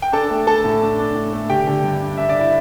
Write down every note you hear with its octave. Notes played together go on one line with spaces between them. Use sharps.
G5
D4 A4 A5
A3
A3 A4 A5
A2
D4
D4
A2
A3
D3 G4 G5
D3
G2
D4
D4 E5
D5
E4 E5